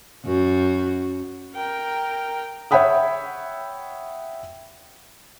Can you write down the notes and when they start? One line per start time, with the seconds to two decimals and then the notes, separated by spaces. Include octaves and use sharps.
0.25 F#2 F#4
1.55 A#4 G5
2.71 C#5 E5 F#5 G5 B5 D#6